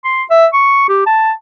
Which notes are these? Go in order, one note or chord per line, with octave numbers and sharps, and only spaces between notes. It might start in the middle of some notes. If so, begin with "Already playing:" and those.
C6
E5
C#6
G4
A5